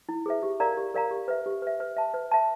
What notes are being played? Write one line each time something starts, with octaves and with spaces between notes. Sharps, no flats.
E4
G#4 B4 E5
G4
A#4 D5 F5 A#5
G4
A#4 D5 F5 A#5
G4
B4 E5
G4
B4 E5
B4
E5 A5
B4
E5 A5